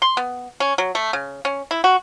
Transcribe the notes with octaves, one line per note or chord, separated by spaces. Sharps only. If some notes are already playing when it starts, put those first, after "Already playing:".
C6
B3
C#4
F#3
A3
C#3
C#4
E4
F#4